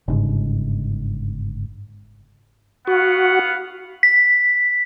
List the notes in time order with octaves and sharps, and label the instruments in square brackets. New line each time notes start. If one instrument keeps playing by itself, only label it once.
[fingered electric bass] G1 G#2 C#3
[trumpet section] B3 F5 F#5 [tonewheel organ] F#4
[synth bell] B6